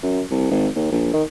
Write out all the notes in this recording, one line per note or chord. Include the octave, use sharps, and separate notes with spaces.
F#2
C2
G#1
D#2
A#1
D#3